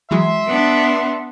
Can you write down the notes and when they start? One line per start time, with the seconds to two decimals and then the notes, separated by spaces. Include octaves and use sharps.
0.11 E3 F#3 G#3 E5 C6
0.47 B3 D4